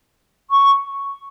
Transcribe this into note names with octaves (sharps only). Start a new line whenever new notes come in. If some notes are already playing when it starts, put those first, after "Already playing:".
C#6